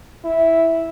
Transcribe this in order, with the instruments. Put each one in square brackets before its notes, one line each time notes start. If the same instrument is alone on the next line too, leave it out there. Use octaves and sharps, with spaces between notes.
[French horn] E4